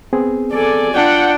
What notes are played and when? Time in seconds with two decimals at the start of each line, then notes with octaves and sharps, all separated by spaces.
0.13 B3 C4 G#4
0.52 A4 D5 G#5
0.95 D4 F4 F#5 G5